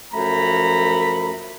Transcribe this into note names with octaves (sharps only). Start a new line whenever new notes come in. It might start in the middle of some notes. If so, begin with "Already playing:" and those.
F#2 F3 A3 A#5 B5